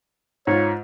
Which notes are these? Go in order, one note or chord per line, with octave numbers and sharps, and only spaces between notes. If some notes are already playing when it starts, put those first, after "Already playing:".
G#2 F4 C#5